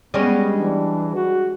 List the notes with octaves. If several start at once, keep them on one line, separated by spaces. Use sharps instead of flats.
G3 G#3 B3 C#4
E3 D4
F#4